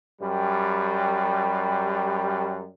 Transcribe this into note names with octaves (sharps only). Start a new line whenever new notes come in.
F#2 G3